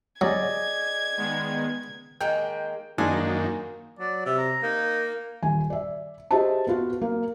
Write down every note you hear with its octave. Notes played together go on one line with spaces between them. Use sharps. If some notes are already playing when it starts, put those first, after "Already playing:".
F#3 G#4 D5 D#5 G#6
D#3 G#3 B3
D#3 G#3 A#3 G5
F#2 D#3 G#3 A#3 D4 D#4 G#5
F#3 D5
C3 E5
A#5
A#3 D#4
D#1 G#5
D5 E5
G4 G#4 C5 D#5 E5 A5
B3 F4 F#4
A#3